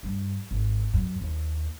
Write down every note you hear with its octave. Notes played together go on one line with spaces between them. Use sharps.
G2
G#1
F#2
D#2